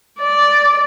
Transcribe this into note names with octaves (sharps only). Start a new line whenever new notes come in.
D5